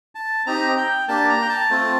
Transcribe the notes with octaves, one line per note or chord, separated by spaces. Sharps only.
A5
C4 D#4 G4 A#5
G5
A#3 D4 G4 A5
A#5
G5
A5
A3 C4 F4